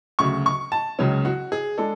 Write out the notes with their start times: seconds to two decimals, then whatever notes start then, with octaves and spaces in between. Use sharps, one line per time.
0.19 D2 C#3 F#3 C#6
0.46 C#6
0.72 A5
0.99 C#2 C#3 F#3 C#4
1.25 F#4
1.52 G#4
1.77 G#3 D4 A4